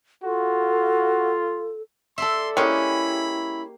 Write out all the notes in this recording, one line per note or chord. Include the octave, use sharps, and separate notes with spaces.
F4 F#4 A4
A4 D5 E5 C6
G#3 A#3 C#4 E4 G4 B5